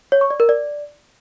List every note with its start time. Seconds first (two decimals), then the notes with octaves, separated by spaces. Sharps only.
0.12 C#5
0.21 C#6
0.30 D5
0.40 A#4
0.49 D5